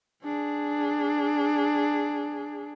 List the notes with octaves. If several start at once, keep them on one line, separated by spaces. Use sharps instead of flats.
D4 G#4